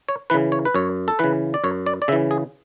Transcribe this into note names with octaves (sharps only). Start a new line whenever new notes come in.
C#5
C#3 E3 B4
C#5
B4
F#2 C#5
A4
C#3 E3 B4
D5
F#2 C#5
D5
D5
C#3 E3 E5
G#4